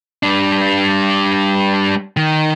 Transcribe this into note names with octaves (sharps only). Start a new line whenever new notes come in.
G3 D4
D#3